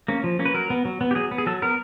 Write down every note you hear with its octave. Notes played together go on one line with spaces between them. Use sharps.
A#3 C#4
F3
A#3 C#4
B4
F#3 A#4
B3
F#3
B3
G4
F#3 G#4
B3
G#4
F#3 A4
B3 A#4